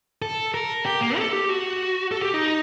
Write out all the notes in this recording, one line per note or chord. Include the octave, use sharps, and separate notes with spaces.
A4
A#4
G4
A#3
A4
G4
F#4
A4
G4
D#4